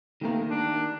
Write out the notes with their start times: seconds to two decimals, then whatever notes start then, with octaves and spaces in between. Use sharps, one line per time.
0.21 D#3 A3 A#3 G4 A#4
0.49 D4